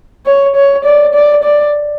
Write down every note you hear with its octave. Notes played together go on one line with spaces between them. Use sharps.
C#5
C#5
D5
D5
D5